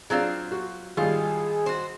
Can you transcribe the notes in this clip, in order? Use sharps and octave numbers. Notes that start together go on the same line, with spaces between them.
F#3 C4 D4 F4 G#4
F#4
G#1 G3 F4 G#4
F#4 C5